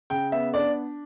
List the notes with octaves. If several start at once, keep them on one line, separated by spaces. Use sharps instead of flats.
C#3 G5
B3 E5
D4 D5